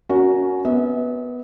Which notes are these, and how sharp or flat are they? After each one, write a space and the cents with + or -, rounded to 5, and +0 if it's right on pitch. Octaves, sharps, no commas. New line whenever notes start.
C#4 +20 F#4 +0 A#4 +0
B3 +0 E5 -45